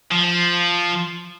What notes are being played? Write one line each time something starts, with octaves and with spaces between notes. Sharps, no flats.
F3